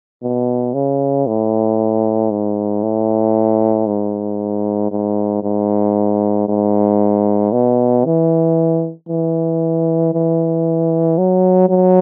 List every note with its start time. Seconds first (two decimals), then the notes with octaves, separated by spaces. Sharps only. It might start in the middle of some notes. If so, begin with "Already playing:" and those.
0.23 B2
0.74 C#3
1.27 A2
2.31 G#2
2.83 A2
3.87 G#2
4.91 G#2
5.43 G#2
6.48 G#2
7.52 B2
8.05 E3
9.09 E3
10.13 E3
11.18 F#3
11.69 F#3